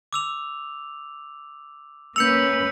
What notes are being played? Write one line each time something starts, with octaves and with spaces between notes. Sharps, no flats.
D6 E6 F7
A#3 C#4 B4 E6 G6 C#7 F7